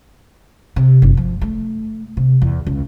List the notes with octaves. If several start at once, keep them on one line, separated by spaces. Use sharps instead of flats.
C3
F#1
F3
A3
C3
E2
C#2